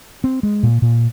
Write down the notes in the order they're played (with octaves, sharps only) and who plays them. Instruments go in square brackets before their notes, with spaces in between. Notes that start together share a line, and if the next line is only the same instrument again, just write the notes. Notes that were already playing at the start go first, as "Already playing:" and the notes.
[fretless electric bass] C4
G#3
A#2
A#2